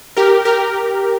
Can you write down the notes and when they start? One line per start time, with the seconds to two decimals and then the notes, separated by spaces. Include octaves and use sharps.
0.17 G4 A#4
0.45 G4 A#4